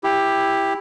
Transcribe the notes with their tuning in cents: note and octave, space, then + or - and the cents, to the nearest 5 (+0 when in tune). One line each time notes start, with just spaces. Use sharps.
E4 +0 G4 +10